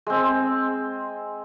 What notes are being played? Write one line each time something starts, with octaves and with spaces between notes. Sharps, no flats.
G#3 C4